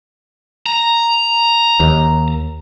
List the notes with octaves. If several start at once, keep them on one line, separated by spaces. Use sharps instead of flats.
A#5
D#2